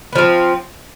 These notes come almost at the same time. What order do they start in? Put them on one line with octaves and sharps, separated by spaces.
B3 F3 C4